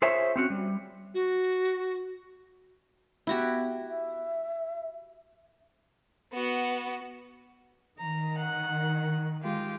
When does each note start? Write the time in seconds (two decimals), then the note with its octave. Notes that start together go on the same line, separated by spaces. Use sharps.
0.02 F4 G#4 C5 C#5 E5
0.36 C4 C#4 F#4
0.50 G3
1.14 F#4
3.27 B3 E4 F#4 G4
3.88 E5
6.33 B3 F#4
7.98 D#3 A#5
8.38 F#5 F#6
9.40 G#3 F4 G4